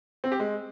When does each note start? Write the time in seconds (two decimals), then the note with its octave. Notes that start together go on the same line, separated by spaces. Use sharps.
0.24 C4
0.32 G4
0.40 G#3